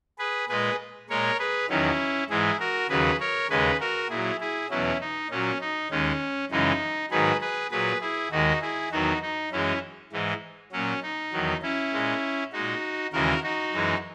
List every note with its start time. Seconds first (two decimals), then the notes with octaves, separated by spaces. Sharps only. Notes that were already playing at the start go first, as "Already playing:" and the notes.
0.19 G#4 B4
0.49 A#2 G#3 G#4 B4
1.10 A#2 G#3 A#4 C#5
1.39 G#4 B4
1.69 E2 D#3 F#3 C#4 E4
2.30 G#2 E3 G#3 E4 G#4
2.60 F#4 A#4
2.90 D#2 C#3 F#3 G#4 B4
3.20 A#4 C#5
3.50 D#2 C#3 G#3 G#4 B4
3.80 F#4 A#4
4.10 A#2 F#3 E4 G#4
4.40 E4 G#4
4.70 E2 B2 F#3 C#4 E4
5.00 D#4
5.31 A#2 F#3 C#4
5.61 D#4
5.91 D#2 D#3 G#3 C#4
6.51 F#2 C#3 E3 G#3 D#4
7.11 G#2 D#3 F#3 G#4 B4
7.41 G#4 B4
7.71 A#2 F#3 G#4 B4
8.01 E4 G#4
8.31 D#2 D#3 G#3 D#4 F#4
8.62 E4 G#4
8.92 E2 D#3 F#3 D#4 F#4
9.22 D#4
9.52 F#2 E3 G#3 C#4 E4
10.12 G#2 E3 G#3
10.72 A#2 F#3 C#4
11.03 D#4
11.33 E2 D#3 F#3
11.62 C#4 E4
11.92 A#2 G#3
12.53 A#2 G#3 D#4 F#4
13.13 D#2 C#3 E3 G#3 F#4 A#4
13.43 D#4 F#4
13.73 F#2 E3 G#3